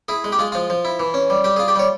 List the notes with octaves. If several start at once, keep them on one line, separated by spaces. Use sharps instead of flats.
E4 G#4
G#3
G4
G#3 F4
F3 F4
F3
E4
E3
C#4
G3
G3 G4
F4 G#4
G4
G3 C#5